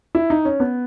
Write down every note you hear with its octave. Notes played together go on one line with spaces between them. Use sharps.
E4
D#4
C#4
B3